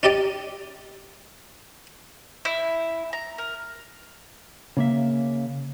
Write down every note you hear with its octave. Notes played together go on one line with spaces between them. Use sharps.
C#4 D#4 G4 D5 D#5
E4
A#5
A#4
C#3 A#3 E5